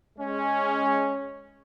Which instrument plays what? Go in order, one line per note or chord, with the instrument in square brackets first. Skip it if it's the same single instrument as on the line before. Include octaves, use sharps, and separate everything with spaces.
[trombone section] G#3 C#4